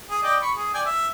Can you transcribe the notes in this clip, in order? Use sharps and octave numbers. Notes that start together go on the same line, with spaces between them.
G#4
D5 D#5 G5
B5 C#6
G#4
D5 G5 G#5
E5